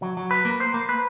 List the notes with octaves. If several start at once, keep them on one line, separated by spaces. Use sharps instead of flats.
F#3
F#3
B4
A#3
C5
A#3
B4